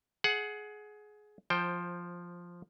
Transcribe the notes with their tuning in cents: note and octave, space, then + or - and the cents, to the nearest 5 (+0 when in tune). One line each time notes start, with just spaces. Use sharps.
G#4 +20 F#5 +0
F3 +0 C5 +20 G5 +0